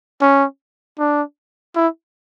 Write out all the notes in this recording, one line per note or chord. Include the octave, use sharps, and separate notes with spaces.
C#4
D4
E4